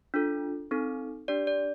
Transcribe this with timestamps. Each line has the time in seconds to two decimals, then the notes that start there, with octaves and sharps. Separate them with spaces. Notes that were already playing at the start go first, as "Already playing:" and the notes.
0.14 D4 F4 A4
0.71 C4 D#4 A4
1.28 D4 G4 D5
1.47 D5